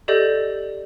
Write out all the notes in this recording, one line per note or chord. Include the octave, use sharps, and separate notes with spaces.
G4 A4 D5 D#5 G6